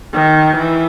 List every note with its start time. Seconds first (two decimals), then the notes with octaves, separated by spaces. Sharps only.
0.13 D#3
0.56 E3